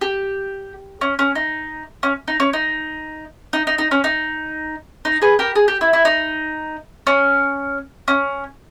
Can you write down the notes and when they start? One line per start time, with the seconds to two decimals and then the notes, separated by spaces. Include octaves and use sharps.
0.01 G4
1.01 C#4
1.19 C#4
1.35 D#4
2.03 C#4
2.28 D#4
2.40 C#4
2.53 D#4
3.53 D#4
3.67 D#4
3.78 D#4
3.91 C#4
4.04 D#4
5.05 D#4
5.22 G#4 B4
5.39 G4 A#4
5.56 G#4
5.68 G4
5.81 E4
5.93 E4
6.05 D#4
7.07 C#4
8.08 C#4